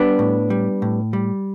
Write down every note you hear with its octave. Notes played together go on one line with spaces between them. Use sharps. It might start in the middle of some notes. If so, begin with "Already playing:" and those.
Already playing: G3 B3 D4
A2
G3
A2
G3